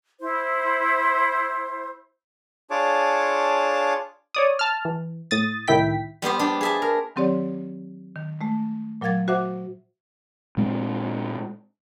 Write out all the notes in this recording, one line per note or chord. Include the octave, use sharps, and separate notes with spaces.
E4 C5
D4 F4 G#4 C#5 A5 D6
C#5 D5 D#6
A5 F6
E3
A2 D#6 A6
C2 A2 D#3 E4 G5 B6
G3 B3 G4 C5
D4 G4
G#4 E5 A5
A#4
D#3 F#3 C4 G4 C#5 D5
D#3
G#3 A3
A#2 F#3 A#4 F5 G#6 A6
F#4 C5 E5 F#5 D6
A#2 G#3 C4